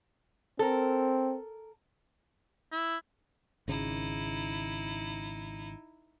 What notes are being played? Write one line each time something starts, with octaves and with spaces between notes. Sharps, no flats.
C4 A4 A#4
E4
G#1 C#3 D#4 E4